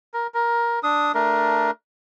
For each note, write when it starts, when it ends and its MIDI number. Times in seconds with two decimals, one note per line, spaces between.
0.14 0.27 70
0.34 0.79 70
0.83 1.12 62
0.83 1.12 87
1.15 1.71 57
1.15 1.71 62
1.15 1.71 70